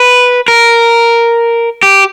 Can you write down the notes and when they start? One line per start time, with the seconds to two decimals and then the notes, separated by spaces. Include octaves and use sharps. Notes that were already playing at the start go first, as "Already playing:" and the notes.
Already playing: B4
0.48 A#4
1.83 G4